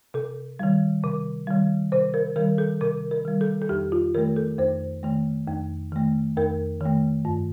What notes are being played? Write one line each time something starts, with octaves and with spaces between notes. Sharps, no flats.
C3 A4
D#3 G3
C3
D#3 G3
C3 C5
A#4
D#3 G3 A#4
A4
C3 A#4
A#4
D#3 G3
A4
A4
F2 G4
F4
D#3 A3 A#4
A4
F2 C5
D#3 A3
F2
D#3 A3
F2 A#4
D#3 A3
G2